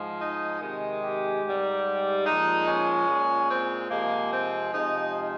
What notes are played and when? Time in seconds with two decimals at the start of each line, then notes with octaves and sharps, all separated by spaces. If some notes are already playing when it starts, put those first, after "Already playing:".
Already playing: G#2 F3 G#3
0.20 D#4
0.61 C3 D#3 G#3
1.02 G4
1.44 G#2 G3
2.26 A#2 F3 G#3 D#4
2.67 C#4
3.09 A#2 G#3
3.50 C4
3.91 C3 F3 G#3 A#3
4.32 C4
4.73 C3 F3 G#3 D#4